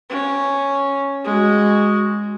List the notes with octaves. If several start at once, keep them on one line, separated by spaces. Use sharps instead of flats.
C#4
G#3 F#4